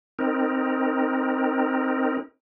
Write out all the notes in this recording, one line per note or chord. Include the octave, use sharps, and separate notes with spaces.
C4 D#4 A#4